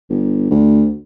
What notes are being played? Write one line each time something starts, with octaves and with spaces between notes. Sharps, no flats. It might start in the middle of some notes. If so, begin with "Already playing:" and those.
G1
D2